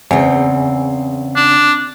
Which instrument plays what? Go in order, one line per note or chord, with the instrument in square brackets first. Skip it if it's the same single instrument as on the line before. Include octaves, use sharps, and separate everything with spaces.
[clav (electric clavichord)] E2 [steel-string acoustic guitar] C#3 C4
[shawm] D4